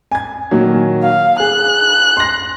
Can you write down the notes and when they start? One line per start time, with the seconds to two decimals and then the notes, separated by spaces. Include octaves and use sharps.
0.12 G#5 G#6
0.51 A#2 D#3 F#3
1.03 F5
1.40 G#4 F#6
2.17 C6 A#6